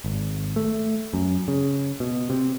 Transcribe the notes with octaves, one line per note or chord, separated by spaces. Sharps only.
G#1
A3
F#2
C#3
B2
C3